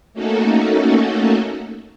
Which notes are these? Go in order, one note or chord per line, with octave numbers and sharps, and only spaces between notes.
A3 A#3 C#4 D#4 F#4 A4